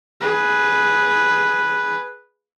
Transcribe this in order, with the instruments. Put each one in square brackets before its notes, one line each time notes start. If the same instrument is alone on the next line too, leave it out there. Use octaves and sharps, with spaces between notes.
[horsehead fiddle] G#4 B4